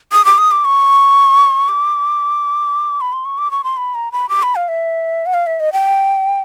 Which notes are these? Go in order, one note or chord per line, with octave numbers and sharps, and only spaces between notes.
D#6
D6
D#6
D6
C#6
D6
B5
C6
C#6
D6
C#6
C6
B5
A#5
B5
D6
B5
F5
E5
F#5
F5
E5
D#5
G5